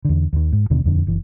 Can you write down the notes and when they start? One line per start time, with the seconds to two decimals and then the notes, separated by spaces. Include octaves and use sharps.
0.05 E2 D3
0.33 D#2 D#3
0.52 G#2
0.70 D#2 B2 D3
0.84 D#1 F2 D3
1.07 F#1 E3